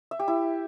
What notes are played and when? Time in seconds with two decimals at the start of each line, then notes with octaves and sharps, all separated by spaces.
0.11 E5
0.19 G4
0.28 E4